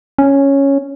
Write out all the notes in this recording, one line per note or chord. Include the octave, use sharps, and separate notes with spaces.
C#4